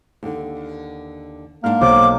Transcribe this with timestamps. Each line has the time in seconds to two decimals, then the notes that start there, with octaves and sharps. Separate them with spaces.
0.23 D#2 D3
1.64 G#2 A#3 D4 F6
1.81 B1 C5 D6